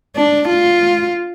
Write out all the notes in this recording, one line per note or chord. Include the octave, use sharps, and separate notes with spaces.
D4
F4